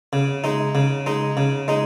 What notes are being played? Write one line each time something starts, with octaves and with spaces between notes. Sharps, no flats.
C#3
G#3 D#4
C#3
G#3 D#4
C#3
G#3 D#4